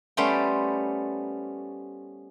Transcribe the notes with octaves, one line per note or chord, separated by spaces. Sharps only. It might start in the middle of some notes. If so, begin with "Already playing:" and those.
G3 A3 B3 C#4 C5 G5